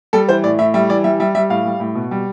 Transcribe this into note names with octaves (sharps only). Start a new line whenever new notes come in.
G3 A4
E3 C5
A2 D5
A2 E5
G3 E5
E3 D5
G3 E5
G3 E5
G3 E5
A2 F5
G3
A2
B2
G3